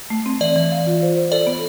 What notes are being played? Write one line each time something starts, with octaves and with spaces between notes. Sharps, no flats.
A3
C4
E3 D5
E3
F5
F4
C5
C5
A4 D5
B3